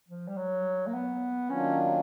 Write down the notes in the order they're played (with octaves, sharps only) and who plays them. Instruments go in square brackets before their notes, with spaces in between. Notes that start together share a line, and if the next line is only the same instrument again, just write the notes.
[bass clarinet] F3
G3
F#3
A#3
B3
[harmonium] D#3 F#3 A#3 D4 F4 [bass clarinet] C#4